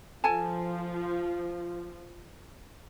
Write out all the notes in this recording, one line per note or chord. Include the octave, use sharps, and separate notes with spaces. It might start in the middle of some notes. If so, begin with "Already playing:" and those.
F3 A4 G#5 A5